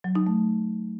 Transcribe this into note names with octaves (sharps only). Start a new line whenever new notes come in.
F#3
D#4
A3